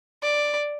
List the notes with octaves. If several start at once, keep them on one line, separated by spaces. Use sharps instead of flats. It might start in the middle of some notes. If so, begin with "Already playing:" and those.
D5